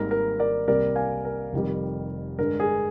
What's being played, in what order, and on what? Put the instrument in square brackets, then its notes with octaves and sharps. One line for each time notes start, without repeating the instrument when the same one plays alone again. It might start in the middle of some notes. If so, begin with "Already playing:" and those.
Already playing: [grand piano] G#1 G#2 D#3 G3 A#3 A#4
A#4
A#4 D5
C2 C3 G3 A#3 A#4 D5
F5 G#5
A#4
F1 F2 D#3 G3
G2 D3 G#3 A#4
G#4